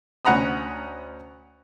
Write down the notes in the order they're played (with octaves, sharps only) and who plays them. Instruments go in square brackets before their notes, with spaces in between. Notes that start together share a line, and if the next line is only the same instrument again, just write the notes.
[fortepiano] D2 C#4 F#5 A#5 B5 D#6